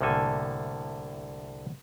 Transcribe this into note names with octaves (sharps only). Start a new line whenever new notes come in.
C2 A2 D3 A#3 A4 G#5